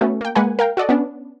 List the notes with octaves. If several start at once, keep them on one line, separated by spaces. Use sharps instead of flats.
A3 B3 C#4 F#4
A#3 G5
G#3 A#3 B4 F#5 G#5
A#4 F5 G5
F#4 A4 D5 D#5
B3 C#4 D4